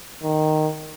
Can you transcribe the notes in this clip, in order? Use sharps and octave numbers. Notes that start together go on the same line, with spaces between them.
D#3